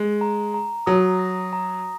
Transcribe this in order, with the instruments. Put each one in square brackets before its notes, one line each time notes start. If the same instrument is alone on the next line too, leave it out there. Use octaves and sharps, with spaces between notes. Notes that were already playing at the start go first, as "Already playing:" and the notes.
Already playing: [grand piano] G#3
[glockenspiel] A#5
A#5
[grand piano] F#3 [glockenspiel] D#6
[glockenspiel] A#6
A#5